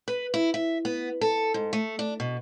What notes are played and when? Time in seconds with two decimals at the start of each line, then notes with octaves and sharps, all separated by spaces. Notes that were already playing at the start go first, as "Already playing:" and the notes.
0.08 B4
0.34 E4
0.54 E5
0.85 B3
1.21 A4
1.54 G#2
1.73 A3
1.99 D4
2.20 B2